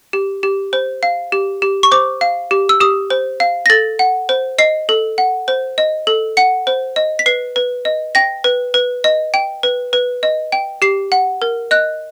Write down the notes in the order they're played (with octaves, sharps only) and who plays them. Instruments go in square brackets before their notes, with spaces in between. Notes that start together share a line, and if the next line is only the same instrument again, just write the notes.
[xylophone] G4
G4
C5
F5
G4
G4
C#6
C5 D6
F5
G4
E6
G4 D#6
C5
F5
A#6
A4 A6
F#5
C5
D#5 C7
A4
F#5
C5
D#5
A4
F#5 C#7
C5
D#5
B6
B4 C7
B4
D#5
G5 A#6
B4
B4
D#5
G5
B4
B4
D#5
G5
G4 C7
F#5
A#4
D#5 F#6